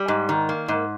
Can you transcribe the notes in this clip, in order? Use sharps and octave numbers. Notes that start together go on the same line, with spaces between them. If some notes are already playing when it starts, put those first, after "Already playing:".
Already playing: G3
G#2
D#3
A#3
G#2